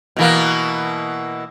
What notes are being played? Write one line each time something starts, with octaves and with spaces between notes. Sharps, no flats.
B2 E3 A#3